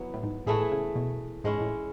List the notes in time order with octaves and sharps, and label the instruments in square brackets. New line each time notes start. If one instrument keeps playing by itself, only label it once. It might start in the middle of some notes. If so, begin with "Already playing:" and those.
Already playing: [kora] F#3 B3 E4
[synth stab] A2
G#2
[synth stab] A2 [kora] E3 A3 E4 G#4
[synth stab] C#3
B2
[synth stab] G#2 [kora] G#3 C#4 E4
[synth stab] A2